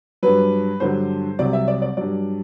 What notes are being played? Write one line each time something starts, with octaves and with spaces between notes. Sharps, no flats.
G2 F#3 B4
G2 D3 F#3 C5
C2 C3 F#3 D5
E5
D5
D5
G2 F#3 D5